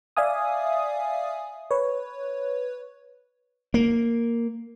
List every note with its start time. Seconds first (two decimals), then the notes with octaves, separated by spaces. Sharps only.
0.17 D5 E5 F5 G#5 D#6
1.71 B4 C#5
3.74 A#3